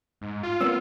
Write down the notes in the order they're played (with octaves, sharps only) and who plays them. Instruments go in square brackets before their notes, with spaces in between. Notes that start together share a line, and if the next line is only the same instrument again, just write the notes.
[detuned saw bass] G#2
F4
[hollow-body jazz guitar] A#3 B3 C#4 [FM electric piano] E6